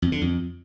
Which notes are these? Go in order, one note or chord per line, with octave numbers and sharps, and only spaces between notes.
F2
D3
F2